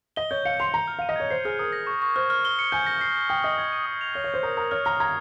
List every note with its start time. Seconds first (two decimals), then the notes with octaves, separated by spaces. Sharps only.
0.16 D#5 G7
0.31 C#5 G6
0.45 F5 C#7
0.59 C6 F7
0.73 A#5 G7
0.88 F6
0.99 F5 D#7
1.09 D#5
1.16 C#5 G#6
1.30 C5 C7
1.45 G#4 F6
1.59 A#4 D#6
1.73 A#6
1.87 C#6
2.02 C#6
2.16 C5 F6
2.30 F6
2.45 G7
2.59 C#7
2.72 G#5 G6
2.86 A#6
3.01 C7
3.15 C7
3.29 G5 D#6
3.43 D#5 D#6
3.58 G#6
3.73 D#7
3.86 D#6
4.01 F7
4.14 C#5 G7
4.24 C#5 G6
4.34 C5
4.43 A#4 D#6
4.57 A#4 D#6
4.71 C#5 F6
4.85 A#5 F6
5.00 A#5 G#6